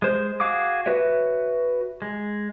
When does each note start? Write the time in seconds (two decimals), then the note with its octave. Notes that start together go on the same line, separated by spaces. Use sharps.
0.02 G#3 C5
0.40 F#4 G#4 F5 D6 D#6
0.86 F#4 B4 C#5 E5
2.02 G#3